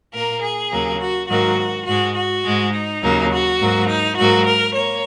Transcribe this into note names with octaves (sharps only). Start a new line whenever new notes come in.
A#2 A#3 A#4
G#4
D#2 C#3 F#3 A#3
F#4
G#2 D#3 F#3 A#3 F#4
G#2 G#3 F#4
F#4
G#2 G#3
D#4
D#2 C#3 F#3 A#3
F#4
G#2 F#3 A#3
D#4
G#2 F#3 A#3 F#4
A#4
A#3 C#5